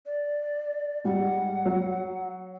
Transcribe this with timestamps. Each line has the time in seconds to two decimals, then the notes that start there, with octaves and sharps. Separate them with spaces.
0.06 D5
1.05 G#2 G3 F#5
1.66 F#3